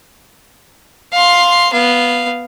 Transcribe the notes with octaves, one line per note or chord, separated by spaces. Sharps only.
F5 C6
B3 F5